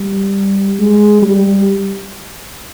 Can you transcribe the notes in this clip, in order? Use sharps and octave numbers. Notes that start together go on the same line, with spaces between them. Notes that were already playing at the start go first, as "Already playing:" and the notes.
Already playing: G3
G#3
G3